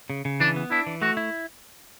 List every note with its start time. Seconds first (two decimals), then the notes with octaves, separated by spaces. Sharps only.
0.10 C#3
0.25 C#3
0.40 E3 D4
0.56 B3
0.71 D4 E4
0.87 E3
1.02 A3 F#4
1.17 E4